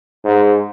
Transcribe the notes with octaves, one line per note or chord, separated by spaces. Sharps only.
G#2